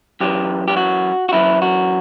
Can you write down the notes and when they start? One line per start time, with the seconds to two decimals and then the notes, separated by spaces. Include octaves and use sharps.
0.20 F#2 E3 G4
0.68 G4
0.77 F#4
1.29 F#4
1.33 F#2 E3 E4
1.62 F#4